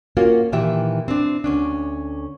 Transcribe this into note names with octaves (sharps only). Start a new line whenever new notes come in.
A#3 C#4 F4 F#4
A#2 D#3 E3 G4 E5
C4 D4
D2 C#4 D4